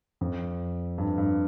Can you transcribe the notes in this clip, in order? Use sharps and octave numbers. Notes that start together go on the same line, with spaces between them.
F2
G2
G2